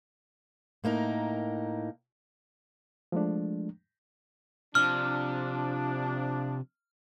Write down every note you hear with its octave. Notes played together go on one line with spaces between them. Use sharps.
A2 A#3 D#4 A#4
F3 G#3 A3 D4
C3 F3 D4 F6